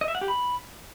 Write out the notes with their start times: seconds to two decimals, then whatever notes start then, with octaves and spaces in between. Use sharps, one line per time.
0.01 D#5
0.08 E5
0.15 F#5
0.21 G4
0.28 B5